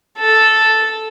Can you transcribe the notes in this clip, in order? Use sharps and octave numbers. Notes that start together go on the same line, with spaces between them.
A4